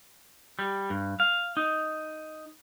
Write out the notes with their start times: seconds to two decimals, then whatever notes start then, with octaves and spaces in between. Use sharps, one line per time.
0.59 G3
0.90 G2
1.20 F5
1.57 D#4